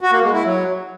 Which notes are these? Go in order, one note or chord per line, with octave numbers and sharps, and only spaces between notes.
F#4
A#3
G#3
E4
F#3